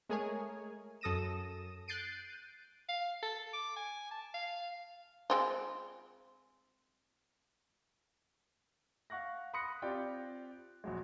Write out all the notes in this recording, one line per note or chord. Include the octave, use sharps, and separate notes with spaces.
G#3 A3 G#4 A#4 C#5 G#5
F#2 A4 D#6 A#6 D#7 E7
F#6 G6 A6 C7 D7 D#7
F5
A4
D6
G#5
A5
F5
G#3 C4 F4
F5 F#5 C#6 F#6 A#6
B5 C6 D#6 F#6 A#6 C#7
C4 F4 G4 D5 F5 G5
A#1 F#3 G#3